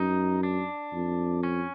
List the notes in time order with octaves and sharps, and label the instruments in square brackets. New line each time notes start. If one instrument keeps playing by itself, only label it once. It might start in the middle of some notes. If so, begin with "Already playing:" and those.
Already playing: [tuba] F#2 [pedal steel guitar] D#4
[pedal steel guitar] D4
[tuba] F2
[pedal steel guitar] C#4